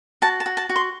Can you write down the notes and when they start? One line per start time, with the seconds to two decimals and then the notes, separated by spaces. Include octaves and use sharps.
0.22 F#4 A5
0.40 A5
0.46 F#4
0.57 A5
0.69 F#4
0.76 C6